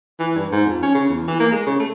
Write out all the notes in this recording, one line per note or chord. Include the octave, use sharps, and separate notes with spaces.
E3
G2
G#2
F2
C#4
C#3
E2
E3
A#3
G#3
C#3
A3